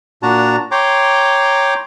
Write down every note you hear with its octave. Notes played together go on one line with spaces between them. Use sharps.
A#2 D4 F#4 A5 A#5
C#5 G5 A#5 C6 D6